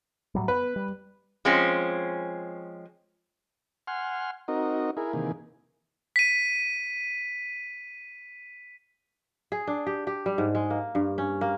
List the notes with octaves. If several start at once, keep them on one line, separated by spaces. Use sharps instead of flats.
A2 F#3 G3
B3 B4
G3
F3 G#3 C4 C#4
F#5 G#5 C6 F6
C4 D#4 F#4 A#4 D#5
E4 G#4 A#4
C3 D#3 E3 A#3 G#4
B6 D#7
G#4
D4
G4
G4
G3
G#2
G#3
A#3
G2
C#4
A#3